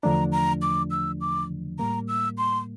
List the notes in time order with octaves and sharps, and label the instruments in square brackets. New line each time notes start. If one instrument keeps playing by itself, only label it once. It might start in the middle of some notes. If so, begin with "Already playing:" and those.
[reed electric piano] E2 D3 F3 A3 D4 [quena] A#5
[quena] A#5
D6
E6
D6
[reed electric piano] A2 G3 A#3 [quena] A#5
[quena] E6
C6